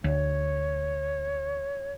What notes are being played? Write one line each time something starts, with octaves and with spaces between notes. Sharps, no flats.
D2 C#5